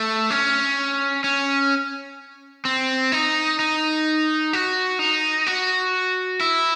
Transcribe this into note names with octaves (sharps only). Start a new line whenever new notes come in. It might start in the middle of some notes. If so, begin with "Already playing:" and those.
Already playing: A3
C#4
C#4
C4
D#4
D#4
F#4
D#4
F#4
E4